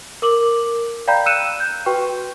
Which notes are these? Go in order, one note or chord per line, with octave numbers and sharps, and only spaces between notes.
A#4 D6 F#7
D5 F5 G5 A#5 B5 G6
E6 F#6 C#7 D#7 E7
G6
F#4 B4 G5 C#6